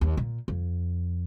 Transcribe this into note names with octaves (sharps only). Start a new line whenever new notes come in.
D#2
A#2
F2